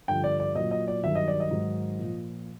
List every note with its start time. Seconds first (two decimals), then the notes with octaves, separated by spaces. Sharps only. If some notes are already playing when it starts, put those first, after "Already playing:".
0.08 G2 D3 F3 G5
0.24 D5
0.40 D5
0.55 A#2 F#3 D#5
0.71 D#5
0.88 D5
1.03 G2 D#3 F#3 E5
1.15 D#5
1.28 D5
1.40 D#5
1.51 G#2 D#3 F#3
1.99 A#2 F3